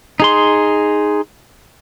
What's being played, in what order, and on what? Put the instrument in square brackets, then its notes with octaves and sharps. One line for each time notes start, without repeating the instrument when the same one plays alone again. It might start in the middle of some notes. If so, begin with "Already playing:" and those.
[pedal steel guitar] D#4 G#4 C6